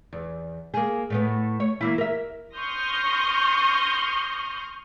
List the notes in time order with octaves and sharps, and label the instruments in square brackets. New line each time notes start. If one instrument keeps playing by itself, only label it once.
[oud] E2
A#3 G#4
A2 A3 B3
C#5
E3 A#3 E4
A#4 E5
[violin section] C6 C#6 D#6 F6 G6 A#6